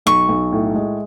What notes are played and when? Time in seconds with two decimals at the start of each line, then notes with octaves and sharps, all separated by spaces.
0.06 B1 C#6
0.29 B1
0.52 A2
0.74 G#3